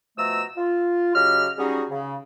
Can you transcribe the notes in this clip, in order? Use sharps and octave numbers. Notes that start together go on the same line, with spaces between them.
B2 F3 A3 D#5 A#5 E6
F4
C#3 F#3 G4 D#5 F6
F#3 G3 C#4 D#4 F#4 G#4
C#3